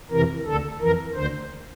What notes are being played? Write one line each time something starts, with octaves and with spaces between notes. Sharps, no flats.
F2 C3 E3 A#4
D2 D3 A4
F2 E3 A#4
D2 D3 C5